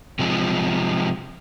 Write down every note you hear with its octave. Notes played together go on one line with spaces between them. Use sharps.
C3 F3 G#3